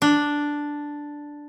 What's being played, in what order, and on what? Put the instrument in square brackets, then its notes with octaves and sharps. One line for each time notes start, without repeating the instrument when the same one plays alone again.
[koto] D4